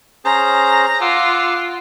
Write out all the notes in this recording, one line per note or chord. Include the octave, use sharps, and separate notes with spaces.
C#4 G#4 C5 A#5
F4 F#5 D6 E6